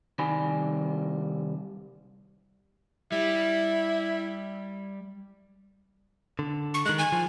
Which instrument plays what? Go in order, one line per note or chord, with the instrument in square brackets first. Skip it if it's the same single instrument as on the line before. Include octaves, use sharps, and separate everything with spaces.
[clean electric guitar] C2 D#3 G3 G4 G#5 B5
[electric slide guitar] G3 [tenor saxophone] E4
[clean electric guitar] D3
[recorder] C#6
[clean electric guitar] D#3 G#3 [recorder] F#6
[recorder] G#5
[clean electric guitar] F3